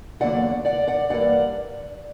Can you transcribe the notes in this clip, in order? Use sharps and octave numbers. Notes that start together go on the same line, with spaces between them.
E2 D3 F#3 A#3 D5 F#5
D5 F#5
D5 F#5
G2 E3 A#3 D5 F#5